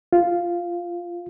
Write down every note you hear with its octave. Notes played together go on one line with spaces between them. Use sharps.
F4